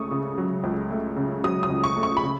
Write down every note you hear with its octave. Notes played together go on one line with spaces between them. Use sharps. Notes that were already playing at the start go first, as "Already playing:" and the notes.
Already playing: C#2 C#3 A3 C#6 D#6
C#3
F#3
C#2
A3
C#3
F#3 D#6
D#6
C#2
C#6
A3
C#6
B5
C#3